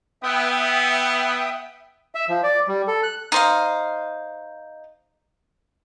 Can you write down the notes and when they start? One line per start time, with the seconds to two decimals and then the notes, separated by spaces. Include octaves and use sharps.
0.23 B3 E5 G5 D#6
2.15 E5
2.29 F3
2.43 D5
2.68 G3
2.88 A4
3.03 F#6
3.32 D#4 C5 F5